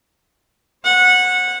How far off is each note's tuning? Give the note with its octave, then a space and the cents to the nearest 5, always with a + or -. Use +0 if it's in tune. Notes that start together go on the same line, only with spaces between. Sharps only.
C5 +45 F#5 -15